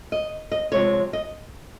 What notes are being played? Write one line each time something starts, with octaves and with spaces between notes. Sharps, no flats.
D#5
D#5
C3 F3 G#3 C#5
D#5